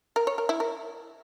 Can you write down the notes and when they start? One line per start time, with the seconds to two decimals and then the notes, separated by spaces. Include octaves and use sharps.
0.16 A#4
0.27 C#5
0.38 A#4
0.49 E4
0.60 A#4